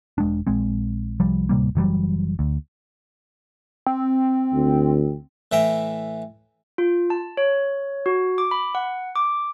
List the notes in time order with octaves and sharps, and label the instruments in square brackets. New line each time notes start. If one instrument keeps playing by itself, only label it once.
[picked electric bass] E1 G#3 D4
A#1 G#3 C4
C2 F3 G3
D1 C3 G3 A#3
F#1 E3 F#3 G3
D2
[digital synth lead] C4
[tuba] D2
[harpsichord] A2 E3 E5 G5 A#5
[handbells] F4
A5
C#5
F#4
D6
B5
F#5
D6